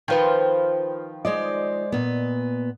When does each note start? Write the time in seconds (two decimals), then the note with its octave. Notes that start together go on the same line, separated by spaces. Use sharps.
0.08 D#3 F3 F4 B4 F5 G5
1.25 G#3 C5 D5 D#5
1.92 A#2 B3